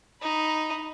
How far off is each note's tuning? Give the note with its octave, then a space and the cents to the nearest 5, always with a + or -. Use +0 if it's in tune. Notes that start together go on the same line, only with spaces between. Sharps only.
D#4 +0 B5 -5